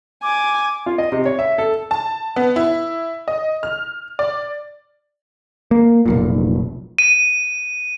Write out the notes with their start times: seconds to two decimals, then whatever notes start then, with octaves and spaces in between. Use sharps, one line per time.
0.23 G#5 D6
0.86 F4
0.98 D#5
1.12 C3
1.25 C#5
1.39 E5
1.58 A4
1.91 A5
2.36 B3
2.56 E4
3.28 D#5
3.63 F6
4.19 D5
5.71 A#3
6.06 F1 B1 A#2
6.98 D#7